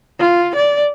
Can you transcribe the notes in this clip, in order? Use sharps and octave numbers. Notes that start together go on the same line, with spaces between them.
F4
D5